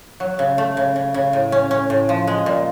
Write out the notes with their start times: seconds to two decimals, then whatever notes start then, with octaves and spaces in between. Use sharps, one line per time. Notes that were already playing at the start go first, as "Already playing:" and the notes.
0.20 F#3
0.39 C#3
0.58 A3
0.77 C#3
0.96 C#3
1.14 C#3
1.33 A2
1.52 C#4
1.71 C#4
1.90 A2
2.09 F3
2.27 G#3
2.46 A#2